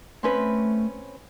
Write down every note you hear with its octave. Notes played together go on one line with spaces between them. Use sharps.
A3 C4 C#4 B4